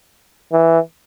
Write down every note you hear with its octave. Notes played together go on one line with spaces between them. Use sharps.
E3